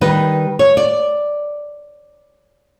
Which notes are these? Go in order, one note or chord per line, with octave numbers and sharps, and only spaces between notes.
D#3 G3 B4
C#5
D5